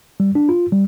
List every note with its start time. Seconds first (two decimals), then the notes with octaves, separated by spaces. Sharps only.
0.20 G3
0.35 D4
0.49 F4
0.72 G3